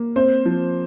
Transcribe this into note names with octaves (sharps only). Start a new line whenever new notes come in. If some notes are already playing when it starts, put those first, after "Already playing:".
Already playing: A#3
C4 C5
F3